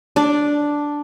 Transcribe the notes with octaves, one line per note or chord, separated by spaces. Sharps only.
D4 D5